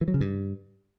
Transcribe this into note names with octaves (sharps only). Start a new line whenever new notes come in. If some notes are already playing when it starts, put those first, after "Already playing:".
E3
F#3
C#3
G2